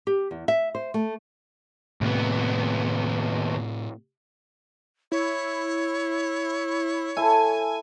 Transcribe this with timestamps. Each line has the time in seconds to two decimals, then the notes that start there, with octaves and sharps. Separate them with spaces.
0.07 G4
0.31 E2
0.48 E5
0.75 C5
0.94 A3
2.01 D#2 A2 C3 B3
5.12 E4 C#5
7.17 E4 A4 G#5 A5